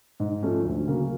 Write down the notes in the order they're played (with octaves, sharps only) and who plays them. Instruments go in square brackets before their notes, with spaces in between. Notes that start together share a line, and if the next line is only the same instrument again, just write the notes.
[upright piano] G#2
F3 A3 C#4
D2
C#3 F#3 A#3